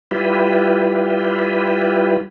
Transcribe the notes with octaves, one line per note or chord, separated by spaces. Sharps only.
G3 E4 F4 G4 B4